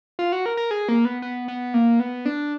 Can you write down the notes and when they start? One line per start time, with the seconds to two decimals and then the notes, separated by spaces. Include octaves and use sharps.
0.19 F4
0.32 F#4
0.46 A#4
0.57 A#4
0.71 G#4
0.89 A#3
1.05 B3
1.22 B3
1.48 B3
1.74 A#3
2.00 B3
2.26 D4